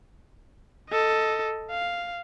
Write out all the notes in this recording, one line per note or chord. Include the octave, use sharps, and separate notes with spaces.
A4 D#5
F5